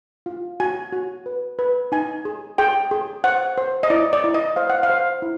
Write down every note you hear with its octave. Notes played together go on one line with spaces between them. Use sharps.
F4
F#4 G#5
F#4
B4
B4
D#4 G#5
G#4
G#4 G5
G#4
C5 F#5
C5
D#5
E4 D5
D5
E4
D#5
C5 F5
F#5
F5
C5
E4